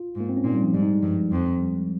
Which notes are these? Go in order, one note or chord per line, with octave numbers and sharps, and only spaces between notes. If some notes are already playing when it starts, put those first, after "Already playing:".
Already playing: F4
G#2
A#3
C4
C#4
A#2 D#4
G3
F3
G#2 G3
D#4
G#3
G2 F3
F2
G3
G#3